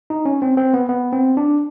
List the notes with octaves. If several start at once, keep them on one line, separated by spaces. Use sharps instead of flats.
D#4
C#4
C4
C4
B3
B3
C4
D4